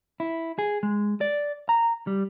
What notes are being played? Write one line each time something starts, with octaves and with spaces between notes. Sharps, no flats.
E4
G#4
G#3
D5
A#5
G3